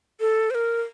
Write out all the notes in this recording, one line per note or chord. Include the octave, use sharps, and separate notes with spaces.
A4
C5
A#4